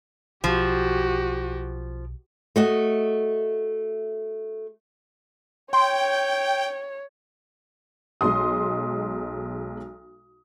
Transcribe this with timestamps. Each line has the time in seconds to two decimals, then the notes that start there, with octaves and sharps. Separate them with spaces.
0.44 B1 F3 F#4 G4
2.56 A3 F#4 D#5
5.73 C#5 G5 C6
8.21 B1 G#3 C6 D#6